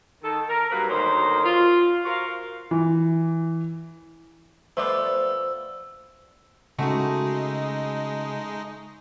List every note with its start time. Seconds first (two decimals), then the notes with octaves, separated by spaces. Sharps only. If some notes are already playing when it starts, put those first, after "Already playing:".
0.23 D#3 A4
0.48 A#4
0.72 G2 F#3 A#3 B4
0.89 D2 D#3 F#3 A#3 C5
1.44 F4
2.05 F#4 A#4 C5 F5
2.71 E3
4.77 F3 A3 B3 B4 C5 D5 E6
6.79 C#3 G#3 A3 D#4 F#4